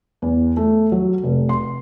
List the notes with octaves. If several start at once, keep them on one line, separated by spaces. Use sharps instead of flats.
E2
A3
F#3
F1
C6